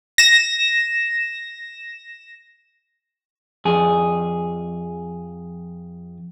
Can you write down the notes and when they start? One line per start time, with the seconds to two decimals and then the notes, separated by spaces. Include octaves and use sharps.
0.18 A#6 E7
3.65 F2 G#4